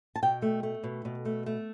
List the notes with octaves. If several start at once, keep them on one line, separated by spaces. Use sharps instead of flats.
A5
B2 G5
A3
A3
B2
B2
A3
A3